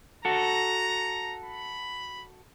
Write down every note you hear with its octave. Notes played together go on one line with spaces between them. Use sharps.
F#4 A4 A#5
B5